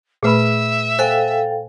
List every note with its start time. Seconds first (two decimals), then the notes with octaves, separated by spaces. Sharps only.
0.23 A#2 A3 G#4 B4 E5 B5
0.99 A4 C5 F5 G5 G#5